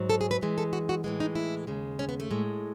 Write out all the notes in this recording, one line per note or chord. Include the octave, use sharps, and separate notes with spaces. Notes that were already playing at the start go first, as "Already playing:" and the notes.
Already playing: G#2 F#3
A4
G#4
B4
F#2 E3 G#3
A4
F#4
F#4
A2 E3 G#3
D#4
E4
D#2 C#3 G#3
C#4
B3
A3
A2 G#3